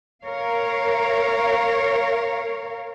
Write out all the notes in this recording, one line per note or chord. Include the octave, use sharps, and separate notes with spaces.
A#4 C#5 F5